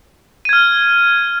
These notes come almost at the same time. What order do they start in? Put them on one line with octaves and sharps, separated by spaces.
D#7 G#6 F6